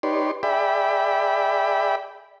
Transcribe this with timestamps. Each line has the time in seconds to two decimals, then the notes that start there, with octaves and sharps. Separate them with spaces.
0.03 D#4 G4 B4 C#5 D5 C6
0.43 G#4 D5 E5 G5 B5